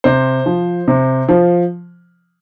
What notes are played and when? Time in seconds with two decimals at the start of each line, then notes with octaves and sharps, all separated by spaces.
0.04 C3 C5
0.46 F3
0.88 C3
1.29 F3